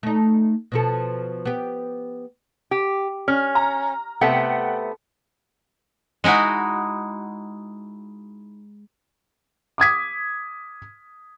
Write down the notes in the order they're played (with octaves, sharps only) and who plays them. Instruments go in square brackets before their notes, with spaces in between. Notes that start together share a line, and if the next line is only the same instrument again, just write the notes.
[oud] A3 D#4
B2 F3 A4
B3 G4
[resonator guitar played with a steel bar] G4
[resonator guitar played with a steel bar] C#4 [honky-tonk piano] F6
[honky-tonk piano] A#5
[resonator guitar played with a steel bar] C3 A3 B3 [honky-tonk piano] F#5 G5 C#7
[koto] G#3 D#4 E4 F#4
[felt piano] D6 D#6 G#6 B6